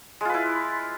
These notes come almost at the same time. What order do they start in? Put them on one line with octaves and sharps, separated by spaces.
G#3 F4 B4 E4